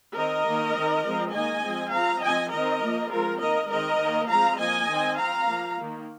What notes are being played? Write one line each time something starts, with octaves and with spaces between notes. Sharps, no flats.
D#3 C4 A#4 D#5
D#3 A#3
D#3 C4
F3 G#3 C4
D#3 A#3 D#5 G#5
F3 G#3 C4
F3 C4 F5 A#5
F3 C4 D#5 G#5
D#3 C4 A#4 D#5
F3 A#3
F3 G#3 C4 F4 A#4
D#3 A#3 A#4 D#5
D#3 G#3 C4 A#4 D#5
D#3 A#3
F3 G#3 C4 F5 A#5
F3 A#3 D#5 G#5
D#3 C4
F3 C4 F5 A#5
F3 A#3
D#3 A#3